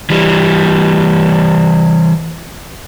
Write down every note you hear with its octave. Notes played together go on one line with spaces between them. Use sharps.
E3 G3